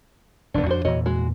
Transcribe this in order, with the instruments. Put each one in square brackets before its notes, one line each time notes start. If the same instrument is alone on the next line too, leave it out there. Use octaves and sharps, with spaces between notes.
[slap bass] F1 E2 [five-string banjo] B3 D4
[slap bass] F2 D4 [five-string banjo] F#4 C5
[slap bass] E2 A#2 E3 [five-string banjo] F#4 C#5 D#5
[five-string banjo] G#3 F#4